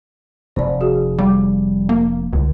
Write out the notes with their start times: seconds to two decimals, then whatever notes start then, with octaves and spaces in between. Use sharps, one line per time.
0.56 F1 C5 D5
0.81 F#4 G#4
1.18 G3 F5 D6
1.89 A#3
2.33 C#2 D3